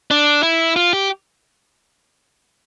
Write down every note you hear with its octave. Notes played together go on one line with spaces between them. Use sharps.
D4
E4
F4
G4